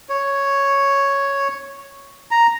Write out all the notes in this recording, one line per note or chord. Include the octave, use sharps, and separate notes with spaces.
C#5
A#5